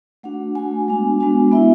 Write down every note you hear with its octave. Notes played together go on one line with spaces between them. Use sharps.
A3 D4 F#4 F#5
A3 D4 F#4 G#5
G#3 B3 D4 F#4
G#3 B3 D4 F#4
B3 E4 E5